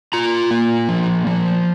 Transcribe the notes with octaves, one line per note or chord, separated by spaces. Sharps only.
F4 A#5
A#3
F3
F3